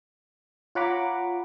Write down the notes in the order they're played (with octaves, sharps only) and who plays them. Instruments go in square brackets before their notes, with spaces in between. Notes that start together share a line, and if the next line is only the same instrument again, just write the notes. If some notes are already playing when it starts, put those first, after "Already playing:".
[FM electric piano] F4 C#5 F#5 A#5 B5 D6